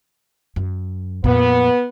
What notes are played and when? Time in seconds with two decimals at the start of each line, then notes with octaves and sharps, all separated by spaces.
0.56 F#2
1.24 F2 A#2 B3